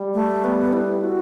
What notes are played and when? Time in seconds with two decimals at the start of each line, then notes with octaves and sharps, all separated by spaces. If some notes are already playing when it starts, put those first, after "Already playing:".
Already playing: G3
0.14 A3
0.44 B3
0.73 E4
1.03 F#4